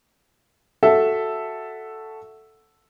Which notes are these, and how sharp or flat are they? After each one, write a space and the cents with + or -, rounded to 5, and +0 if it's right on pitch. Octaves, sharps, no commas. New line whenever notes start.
F#4 +0 A4 +0 E5 +0